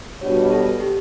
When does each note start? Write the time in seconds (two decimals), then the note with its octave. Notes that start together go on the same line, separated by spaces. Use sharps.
0.21 B2 G3 D4 F#4 C#5
0.37 B4
0.51 A4
0.80 G4